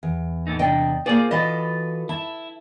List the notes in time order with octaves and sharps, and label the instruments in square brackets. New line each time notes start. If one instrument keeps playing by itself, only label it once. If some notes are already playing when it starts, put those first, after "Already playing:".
[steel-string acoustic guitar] E2
[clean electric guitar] A2 A3 D#4
[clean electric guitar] C3 D4 [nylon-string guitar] D#5 G5
[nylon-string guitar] A#3 C5 [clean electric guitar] F4 G#4 D5
[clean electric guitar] E3 F4 [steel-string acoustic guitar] F#4 A4 B4 [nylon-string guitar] D#5
[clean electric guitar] E4 [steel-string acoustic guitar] A5